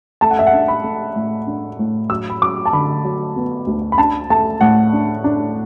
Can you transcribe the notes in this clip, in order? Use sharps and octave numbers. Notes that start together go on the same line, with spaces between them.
A3 A5
F#5
E5
F#5
D4
B5
A3
A2
D4
A2
F#3 E6
B5
F#3 D6
A5
D3 B5
F#3
B3
D2
B5
D4 A5
A3 A5
A2 F#5
D4
D4